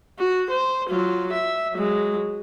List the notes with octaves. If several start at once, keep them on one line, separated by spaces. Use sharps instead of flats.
F#4
C5
F#3 F4
E5
F#3 G#3